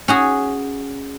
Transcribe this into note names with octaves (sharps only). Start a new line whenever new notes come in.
C#4 F#4 G#4